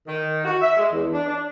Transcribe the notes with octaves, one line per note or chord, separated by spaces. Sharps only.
D#3
F#4
E5
G#3
E2
D4
D4